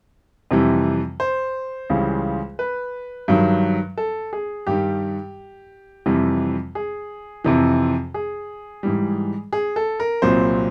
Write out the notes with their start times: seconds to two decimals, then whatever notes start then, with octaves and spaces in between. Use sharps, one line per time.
0.51 F2 C3 E3 G3
1.20 C5
1.90 C#2 C#3 E3 G3
2.59 B4
3.28 G2 D#3 F#3
3.97 A4
4.33 G#4
4.67 G2 D#3 G3 G4
6.06 F2 C3 E3 G3
6.75 G#4
7.44 F2 C3 E3
8.14 G#4
8.83 G#2 E3 G3
9.53 G#4
9.76 A4
10.00 A#4
10.22 C2 A#2 F#3 C5